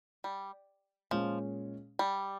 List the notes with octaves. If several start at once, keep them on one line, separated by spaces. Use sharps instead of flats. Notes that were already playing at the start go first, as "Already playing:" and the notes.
G3
A#2 F3 G#3 C#4 G#4
G3